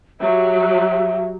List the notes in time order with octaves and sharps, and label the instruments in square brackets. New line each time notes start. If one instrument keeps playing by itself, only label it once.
[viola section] F#3 G4 [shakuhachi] E5